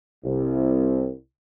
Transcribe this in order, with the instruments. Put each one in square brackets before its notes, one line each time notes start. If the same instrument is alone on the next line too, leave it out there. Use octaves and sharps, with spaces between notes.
[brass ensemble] C2